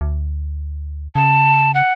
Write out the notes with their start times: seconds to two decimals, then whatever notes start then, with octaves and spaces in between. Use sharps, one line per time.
0.01 D2
1.15 C#3 A5
1.74 F#5